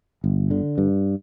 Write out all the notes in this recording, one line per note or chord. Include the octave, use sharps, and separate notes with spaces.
G1
D3
G2